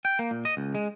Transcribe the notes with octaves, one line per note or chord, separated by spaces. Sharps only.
G5
A#3
A#2
D#5
C#2
G#3